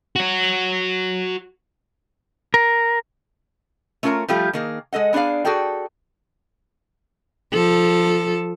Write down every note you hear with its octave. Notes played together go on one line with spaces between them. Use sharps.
F#4 C#5
A#4
A3 C#4 F4 A#4 C#5 A#5
F3 G3 A3 F4 G4
D#3 A#3 G#4
G#3 A4 D#5 F#5
B3 D4 G#4 D5 F5
F#4 G#4 A4 D5 G5
F3 A4